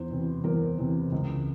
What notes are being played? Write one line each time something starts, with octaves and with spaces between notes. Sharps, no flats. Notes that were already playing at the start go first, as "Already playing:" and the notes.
Already playing: E2 C5
C3 E3
E2 A#4
C3 E3
C#2